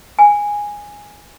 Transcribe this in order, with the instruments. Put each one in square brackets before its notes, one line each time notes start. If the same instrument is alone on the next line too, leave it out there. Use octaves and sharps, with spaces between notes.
[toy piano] G#5